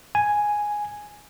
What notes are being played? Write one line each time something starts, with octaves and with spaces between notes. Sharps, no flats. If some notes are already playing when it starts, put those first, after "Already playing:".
G#5